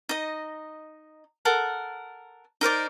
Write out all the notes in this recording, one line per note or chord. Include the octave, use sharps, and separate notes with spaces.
D#4 D#5
A4 A#4 F#5
D#4 A#4 C5 D5